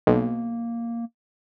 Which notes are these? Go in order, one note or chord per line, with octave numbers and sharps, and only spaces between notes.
B1 A#3